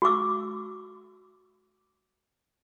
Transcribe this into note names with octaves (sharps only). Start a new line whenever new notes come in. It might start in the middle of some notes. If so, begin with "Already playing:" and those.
F#4 C#6 D6 E6